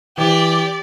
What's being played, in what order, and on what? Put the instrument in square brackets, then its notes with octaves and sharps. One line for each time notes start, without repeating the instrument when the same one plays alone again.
[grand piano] E3 [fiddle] G4 [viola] D5